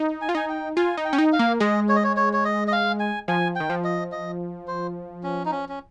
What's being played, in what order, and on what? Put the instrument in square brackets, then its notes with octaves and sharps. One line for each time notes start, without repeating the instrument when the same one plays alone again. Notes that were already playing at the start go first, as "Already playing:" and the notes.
Already playing: [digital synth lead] D#4
[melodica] G#5
[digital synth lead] F4
[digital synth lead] D#4 [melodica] G#5
[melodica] G5
[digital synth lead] F4 [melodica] G#5
[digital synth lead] D#4
[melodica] G5
[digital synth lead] C#4
D#4
[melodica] F5
[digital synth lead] A#3
[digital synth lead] G#3 [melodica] D#5
[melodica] C#5
D#5
C#5
C#5
C#5
D#5
D#5
F5
G#5
[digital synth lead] F3 [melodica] G#5
[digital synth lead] D#3 [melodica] G5
[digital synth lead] F3
[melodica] D#5
D#5
C5
C#4
D#4
C#4
C#4